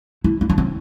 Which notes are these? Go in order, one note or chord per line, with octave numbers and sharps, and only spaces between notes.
E4
E4
D4
C4